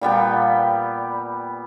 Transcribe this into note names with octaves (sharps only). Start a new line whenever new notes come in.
A#2 G3 B3 G5